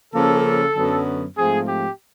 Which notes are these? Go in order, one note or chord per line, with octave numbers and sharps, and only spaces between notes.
C#3 F3 A#3 C#4 A4
F#2 D3 F#3 B3
G#2 F3 A3 C4 G#4
G4